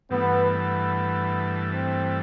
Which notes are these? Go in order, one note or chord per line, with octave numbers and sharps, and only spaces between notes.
G2 E3 A3 B3
B3
C4